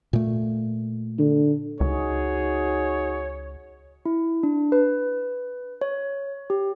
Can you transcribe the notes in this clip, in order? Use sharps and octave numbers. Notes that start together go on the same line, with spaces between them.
A#2 A3
D3
C#2 D#4 F#4 G#4 C#5
E4
D4
B4
C#5
G4